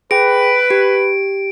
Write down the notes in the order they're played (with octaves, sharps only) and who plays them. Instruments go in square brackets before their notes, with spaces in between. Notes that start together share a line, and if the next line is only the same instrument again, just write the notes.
[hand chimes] G#4 G5 [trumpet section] B4 [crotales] D7
[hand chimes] G4